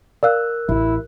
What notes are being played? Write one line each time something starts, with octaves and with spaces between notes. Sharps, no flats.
A#4 D5 F5 E6 F#6
A1 E4